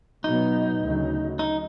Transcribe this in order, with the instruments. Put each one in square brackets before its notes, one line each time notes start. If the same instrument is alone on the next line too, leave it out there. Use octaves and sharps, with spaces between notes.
[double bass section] B2 F#3 B3 [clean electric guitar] D#4
[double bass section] D2 C#3 F#3
[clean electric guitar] D#4